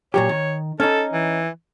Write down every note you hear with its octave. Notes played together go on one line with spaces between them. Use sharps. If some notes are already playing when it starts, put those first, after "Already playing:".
A#2 F#3 G4 C#5
D#3
C#4 D#4 A4
E3